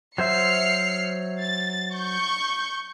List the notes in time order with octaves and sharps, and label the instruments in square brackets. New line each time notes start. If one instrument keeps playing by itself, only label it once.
[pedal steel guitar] F#3 C5 E5 [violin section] F6 C7 C#7
[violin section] A6
C#6 G6